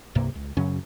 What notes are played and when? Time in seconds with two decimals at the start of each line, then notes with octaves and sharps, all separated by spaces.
0.15 C2 G2 C3 A#3
0.35 C#2
0.57 F#2 C#3 F#3 C#4